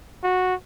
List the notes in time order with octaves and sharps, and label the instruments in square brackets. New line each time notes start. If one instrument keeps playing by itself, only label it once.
[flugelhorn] F#4